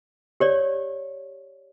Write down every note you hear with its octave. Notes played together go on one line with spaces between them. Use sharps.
G4 C#5 D5